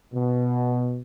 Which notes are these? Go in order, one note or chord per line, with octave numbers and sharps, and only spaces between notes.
B2